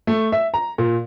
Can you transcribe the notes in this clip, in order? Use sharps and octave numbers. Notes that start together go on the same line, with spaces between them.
A3
E5
A#5
A#2